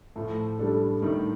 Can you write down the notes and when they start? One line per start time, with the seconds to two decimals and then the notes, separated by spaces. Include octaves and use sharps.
0.15 A2 F3 A3
0.59 G3 D4 A4
1.02 A2 D#3 G3